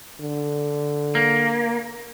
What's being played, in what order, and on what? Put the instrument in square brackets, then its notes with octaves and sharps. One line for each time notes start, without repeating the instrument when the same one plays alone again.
[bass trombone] D3
[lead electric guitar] A#3